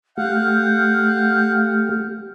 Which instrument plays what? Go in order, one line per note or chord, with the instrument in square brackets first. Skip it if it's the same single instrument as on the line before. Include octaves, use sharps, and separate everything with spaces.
[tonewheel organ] A3 G4 [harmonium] F5 F#5 [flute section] F6 G6